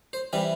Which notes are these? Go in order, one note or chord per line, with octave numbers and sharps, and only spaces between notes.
C5
C3 E3 G3 B4